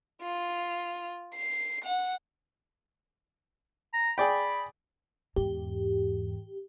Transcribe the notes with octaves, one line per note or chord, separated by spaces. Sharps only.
F4
C7
F#5
A#5
G#4 D5 G5 B5
E2 G#2 G4